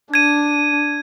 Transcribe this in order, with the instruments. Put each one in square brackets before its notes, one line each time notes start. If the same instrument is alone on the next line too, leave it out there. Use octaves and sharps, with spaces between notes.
[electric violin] D4 [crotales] G#6 D#7